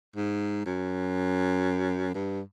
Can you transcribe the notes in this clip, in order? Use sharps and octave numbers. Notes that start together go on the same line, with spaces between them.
G#2
F#2
G2